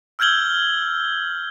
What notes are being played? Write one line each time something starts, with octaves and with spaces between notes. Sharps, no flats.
E6 F6 G6 G#6 F#7 G7